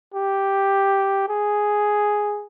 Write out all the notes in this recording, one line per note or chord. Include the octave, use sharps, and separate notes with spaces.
G4
G#4